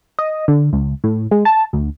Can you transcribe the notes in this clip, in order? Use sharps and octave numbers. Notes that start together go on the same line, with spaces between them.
D#5
D3
C#2
A2
G#3
A5
D2